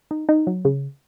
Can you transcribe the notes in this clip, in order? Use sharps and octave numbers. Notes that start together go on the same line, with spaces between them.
D#4
D#4
F#3
C#3